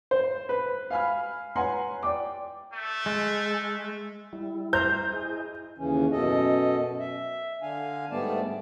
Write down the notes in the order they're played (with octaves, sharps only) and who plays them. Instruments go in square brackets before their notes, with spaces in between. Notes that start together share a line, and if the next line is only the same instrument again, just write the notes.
[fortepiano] C5
B4
[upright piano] F5 G#5 B5 F6
B4 C#5 F#5 G#5 A#5 C6
D5 G5 D6
[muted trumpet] A3
[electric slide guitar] G#3
[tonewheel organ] G3 E4
[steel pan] C5 A#5 [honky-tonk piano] G6
[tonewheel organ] E4 G#4 D#5
[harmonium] D#2 C#3 E3 C#4
F#2 B2 A4 D#5
E5
D3 D4 F5 G#5
G#2 G3 A3 B3 D5 A5